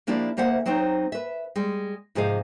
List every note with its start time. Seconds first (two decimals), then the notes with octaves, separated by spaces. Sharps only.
0.07 F3 A#3 D4 E4 G4 D5
0.37 D2 A#3 C5 E5 F#5
0.66 F#3 C4 D#4 C5 C#5
1.12 B4 E5
1.56 G3 G#3
2.15 G#2 C3 F3 G#4 D#5 F5